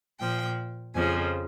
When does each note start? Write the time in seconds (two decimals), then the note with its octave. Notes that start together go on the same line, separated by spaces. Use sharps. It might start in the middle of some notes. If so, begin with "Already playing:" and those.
0.19 A#2 F3 G5
0.94 F2 C#3 F3 G#5